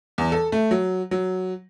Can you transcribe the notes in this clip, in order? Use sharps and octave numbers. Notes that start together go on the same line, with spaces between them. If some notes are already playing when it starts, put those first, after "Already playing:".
E2
A4
A3
F#3
F#3